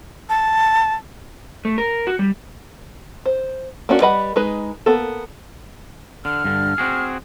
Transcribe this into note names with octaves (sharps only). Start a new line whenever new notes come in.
A5
A3
A#4
F#4
G3
C5
A#3 C#4 D4 F#4
G3 B4 D#5 F#5 B5
G#3 D#4 B4
A#3 B3 A4
D3 F6
G2 D3
C4 F#4 G#4